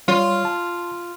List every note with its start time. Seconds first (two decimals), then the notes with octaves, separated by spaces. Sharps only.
0.08 G3 F4 C#5
0.45 A5